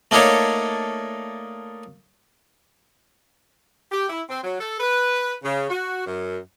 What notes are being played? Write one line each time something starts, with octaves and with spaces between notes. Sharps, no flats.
A3 A#3 D4 D#4 A4 C#5
G4
E4
C4
F#3
A4
B4
C#3
F#4
F#2